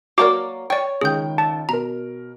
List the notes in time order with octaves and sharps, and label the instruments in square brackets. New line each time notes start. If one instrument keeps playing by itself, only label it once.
[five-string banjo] F#3 A#3 D5 [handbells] F#4 A#4 [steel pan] D6
[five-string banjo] C#5 [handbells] D5 G5
[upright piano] C#2 D#3 G5 [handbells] G#4 G6
[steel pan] A5
[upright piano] B2 A#4 [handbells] A#5